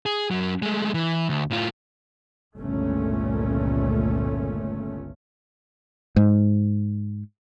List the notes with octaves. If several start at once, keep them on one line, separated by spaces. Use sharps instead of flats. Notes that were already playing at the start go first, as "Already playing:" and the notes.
G#4
F#2 F#3
G#3 A3
E3
D2
A2 F4
G1 C#2 A#2 A3 C#4
G#2